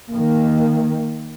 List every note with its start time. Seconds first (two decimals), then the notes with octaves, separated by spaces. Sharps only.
0.11 D#3 A#3